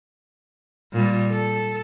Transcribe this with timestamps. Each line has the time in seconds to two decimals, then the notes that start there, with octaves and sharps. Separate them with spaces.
0.93 A#2 G3
1.30 A4